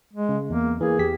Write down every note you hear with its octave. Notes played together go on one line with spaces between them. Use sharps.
G#3
C#3
E2 A#3
E3 A#3 G#4
E2 G4 B6